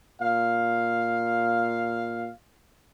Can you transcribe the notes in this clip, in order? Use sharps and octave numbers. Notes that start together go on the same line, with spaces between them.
A#2 F5